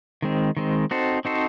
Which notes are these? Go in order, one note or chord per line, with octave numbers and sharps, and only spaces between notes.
D#3 G#3 C4
D#3 G#3 C4
C4 D#4 F#4 A4 C5
C4 D#4 F#4 A4 C5